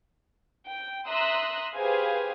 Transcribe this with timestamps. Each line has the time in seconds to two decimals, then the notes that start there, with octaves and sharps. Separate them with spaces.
0.66 G5
1.07 E5 A#5 C6 D#6 E6 F#6
1.74 G4 G#4 B4 C5 F5 G#5